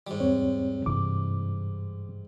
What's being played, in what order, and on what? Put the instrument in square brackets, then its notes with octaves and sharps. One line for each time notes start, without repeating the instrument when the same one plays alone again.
[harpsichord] G#2 G3
[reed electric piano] E2 C4 C#5
[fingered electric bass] G2 C3 E3 [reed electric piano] D6